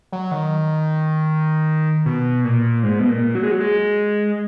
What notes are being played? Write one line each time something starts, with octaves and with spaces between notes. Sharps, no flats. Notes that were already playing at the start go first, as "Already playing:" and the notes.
F#3
D#3
B2
A#2
G#2
B2
A#2
F#3
G#3
F#3
G#3